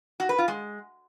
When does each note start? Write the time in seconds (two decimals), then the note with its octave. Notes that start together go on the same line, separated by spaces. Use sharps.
0.20 F#4
0.29 B4
0.38 F4
0.48 G#3